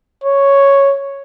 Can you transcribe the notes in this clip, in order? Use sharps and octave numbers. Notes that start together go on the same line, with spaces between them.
C#5